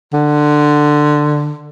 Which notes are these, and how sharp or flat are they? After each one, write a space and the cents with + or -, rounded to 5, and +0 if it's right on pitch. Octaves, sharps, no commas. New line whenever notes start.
D3 +15